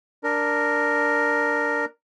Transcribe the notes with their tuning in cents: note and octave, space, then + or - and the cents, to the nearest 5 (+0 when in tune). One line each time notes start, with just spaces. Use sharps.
D4 +0 A#4 +0